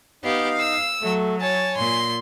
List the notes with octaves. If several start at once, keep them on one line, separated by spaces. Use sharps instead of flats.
B3 D#4 G4 F5
E6
F#3 A3
C#5 G#5 A5
A#2 C6